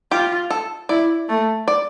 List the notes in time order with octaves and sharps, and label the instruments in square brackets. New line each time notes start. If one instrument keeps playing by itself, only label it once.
[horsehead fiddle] F4 [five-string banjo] G4
[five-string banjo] A4
[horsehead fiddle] E4 [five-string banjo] D5
[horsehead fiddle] A3
[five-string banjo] D5